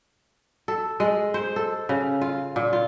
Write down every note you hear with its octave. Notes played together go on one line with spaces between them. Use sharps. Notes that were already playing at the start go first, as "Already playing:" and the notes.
A4
G#3
C5
A4
C#3
F4
A#2
F4